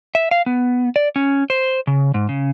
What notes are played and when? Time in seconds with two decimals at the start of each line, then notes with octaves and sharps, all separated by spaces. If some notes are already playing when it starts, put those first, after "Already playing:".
0.15 E5
0.31 F5
0.46 B3
0.96 D5
1.16 C#4
1.50 C5
1.87 C#3
2.14 G#2
2.29 C#3